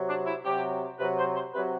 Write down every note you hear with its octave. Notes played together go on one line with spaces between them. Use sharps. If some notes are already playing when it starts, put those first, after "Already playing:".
Already playing: C3 F#3
D4
E4
C3 F#3 G4
C3 F#3 B4
C5
C5
C3 F#3 B4